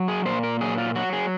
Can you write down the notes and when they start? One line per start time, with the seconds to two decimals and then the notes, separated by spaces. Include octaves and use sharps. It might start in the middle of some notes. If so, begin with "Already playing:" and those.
Already playing: F#3
0.08 G#4
0.26 A#2 C5
0.43 A#4
0.61 F#3 G#4
0.78 F4
0.95 F#3 F#4
1.13 G#4